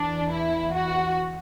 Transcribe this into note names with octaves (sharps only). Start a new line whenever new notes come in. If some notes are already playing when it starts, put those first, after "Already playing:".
Already playing: E2 E3 D4
E4
F#4